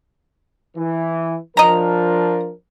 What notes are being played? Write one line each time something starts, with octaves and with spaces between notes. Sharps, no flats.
E3
F3 D4 A#4 D#5 A#5